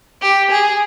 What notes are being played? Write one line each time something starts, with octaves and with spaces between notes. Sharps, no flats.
G4
G#4